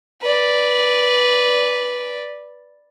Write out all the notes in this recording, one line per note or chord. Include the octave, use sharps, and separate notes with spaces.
B4 D5